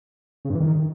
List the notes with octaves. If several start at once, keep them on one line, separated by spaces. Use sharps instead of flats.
C#3
G2
E3
D#3